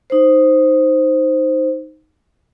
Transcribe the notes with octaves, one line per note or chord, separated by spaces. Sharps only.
D#4 C5